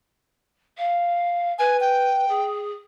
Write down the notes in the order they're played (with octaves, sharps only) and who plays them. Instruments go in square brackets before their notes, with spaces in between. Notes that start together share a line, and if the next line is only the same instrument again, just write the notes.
[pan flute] F5
[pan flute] B4 [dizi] G#5
[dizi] G5
[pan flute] G#4